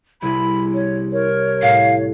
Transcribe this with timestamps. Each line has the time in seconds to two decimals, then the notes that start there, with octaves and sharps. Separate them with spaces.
0.22 C2 C3 E4 G#4 B5
0.74 C#5
1.12 A#4 C#5
1.62 A2 F5